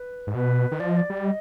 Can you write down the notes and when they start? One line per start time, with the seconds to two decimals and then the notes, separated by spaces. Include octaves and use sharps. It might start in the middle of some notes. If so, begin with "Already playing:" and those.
Already playing: B4
0.27 G#2
0.35 B2 B4
0.72 D#3
0.80 F3 D5
0.89 D#5
0.97 D5
1.10 G3
1.25 D#5